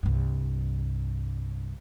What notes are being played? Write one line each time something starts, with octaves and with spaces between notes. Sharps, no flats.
C2 G2